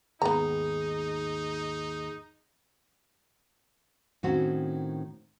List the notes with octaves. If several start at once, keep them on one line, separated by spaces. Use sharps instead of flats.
D#2 G#2 B3 D#4 G#4 A#5
A2 D#3 C4 C#4 F#4